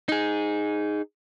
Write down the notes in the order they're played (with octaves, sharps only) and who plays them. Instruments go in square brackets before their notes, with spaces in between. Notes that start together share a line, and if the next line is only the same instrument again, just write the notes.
[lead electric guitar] D#4 G#4